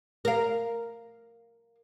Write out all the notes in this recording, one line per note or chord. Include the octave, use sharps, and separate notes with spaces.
A#4 F5